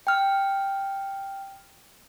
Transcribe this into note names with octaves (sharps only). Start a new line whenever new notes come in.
G5 F6